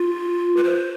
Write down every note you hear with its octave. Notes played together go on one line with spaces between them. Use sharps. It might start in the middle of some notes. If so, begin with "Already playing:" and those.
Already playing: F4
B4
C5